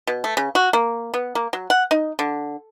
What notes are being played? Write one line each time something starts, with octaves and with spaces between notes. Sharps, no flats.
B2
A3
C#3
F#4
A#3
B3
A#3
F#3
F#5
D#4
D3